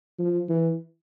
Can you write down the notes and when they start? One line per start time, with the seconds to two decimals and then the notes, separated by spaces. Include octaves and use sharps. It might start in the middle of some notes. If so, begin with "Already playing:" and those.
0.19 F3
0.49 E3